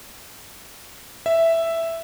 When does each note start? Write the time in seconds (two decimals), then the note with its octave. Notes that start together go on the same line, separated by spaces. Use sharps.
1.26 E5